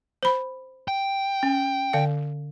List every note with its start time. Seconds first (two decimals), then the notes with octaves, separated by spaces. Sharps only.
0.23 C5 B5
0.88 G5
1.43 C#4
1.93 D3 D5 F5